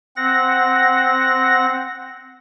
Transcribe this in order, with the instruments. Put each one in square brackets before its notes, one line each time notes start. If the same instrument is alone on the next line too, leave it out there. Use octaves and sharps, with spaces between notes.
[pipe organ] C4 F#5 A#6